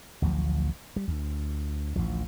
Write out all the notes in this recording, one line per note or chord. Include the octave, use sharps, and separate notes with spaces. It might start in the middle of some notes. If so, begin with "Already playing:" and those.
A1 D2 F3 F#3
G3
D2
A1 D2 F3